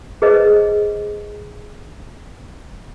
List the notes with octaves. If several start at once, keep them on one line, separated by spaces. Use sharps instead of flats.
G#4 B4 C5 D#5